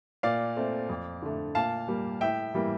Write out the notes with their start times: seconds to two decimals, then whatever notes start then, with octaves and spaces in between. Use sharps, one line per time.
0.23 A#2 D5 F5
0.57 A3 C4
0.89 F2
1.22 D3 A3
1.55 A#2 F5 A5
1.88 G3 A#3
2.21 A2 E5 G5
2.54 E3 G3 A#3